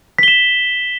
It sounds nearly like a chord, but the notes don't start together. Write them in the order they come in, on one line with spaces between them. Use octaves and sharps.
B6 G7 E7